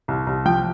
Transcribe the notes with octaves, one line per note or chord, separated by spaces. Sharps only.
C2
C2
F3 G5